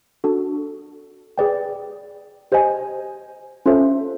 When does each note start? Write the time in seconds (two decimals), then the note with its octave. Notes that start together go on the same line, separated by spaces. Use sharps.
0.24 D4 F#4 A4
1.38 G#4 B4 D5 G5
2.52 G4 C5 D#5 G#5
3.66 C#4 F4 A4 C5 E5